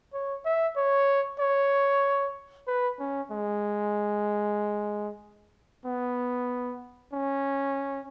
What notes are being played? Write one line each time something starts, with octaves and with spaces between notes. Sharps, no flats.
C#5
E5
C#5
C#5
B4
C#4
G#3
B3
C#4